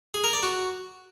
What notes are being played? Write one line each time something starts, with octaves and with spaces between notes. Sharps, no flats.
G#4
A#4
D5
F#4